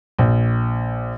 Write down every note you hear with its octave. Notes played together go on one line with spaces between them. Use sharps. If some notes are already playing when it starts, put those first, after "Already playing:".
A#1